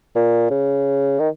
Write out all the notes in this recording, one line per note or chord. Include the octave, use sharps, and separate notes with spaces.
A#2
C#3
D#3